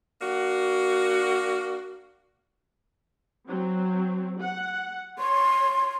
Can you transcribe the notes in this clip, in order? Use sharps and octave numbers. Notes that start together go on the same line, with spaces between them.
A#3 D4 F#4
F#3 C4
F#5
C#5 C6